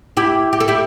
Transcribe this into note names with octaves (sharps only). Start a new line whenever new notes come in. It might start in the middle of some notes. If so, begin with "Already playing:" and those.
E4 G4
G4
A4
E4 G4